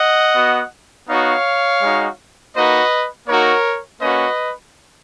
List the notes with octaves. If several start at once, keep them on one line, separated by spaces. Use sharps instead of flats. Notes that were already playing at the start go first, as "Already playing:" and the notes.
Already playing: D#5 F#5
B3 F#4
B3 D#4 F#4 C#5 F5
G#3 D#4 F#4
A#3 D#4 F#4 B4 D#5
A#3 D#4 F#4 A#4 C#5
A#3 C#4 F#4 B4 D#5